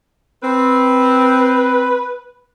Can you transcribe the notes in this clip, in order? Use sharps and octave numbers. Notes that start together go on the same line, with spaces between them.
C4 B4